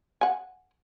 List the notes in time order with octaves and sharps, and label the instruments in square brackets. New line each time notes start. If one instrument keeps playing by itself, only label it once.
[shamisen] F#5 G#5